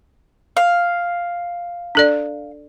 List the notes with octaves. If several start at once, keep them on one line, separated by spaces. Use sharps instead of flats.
F5
D4 A4 D5